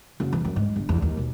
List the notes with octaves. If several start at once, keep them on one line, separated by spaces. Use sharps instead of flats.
F#1
E2
F#2
G#2
G1
E2
D#2
B1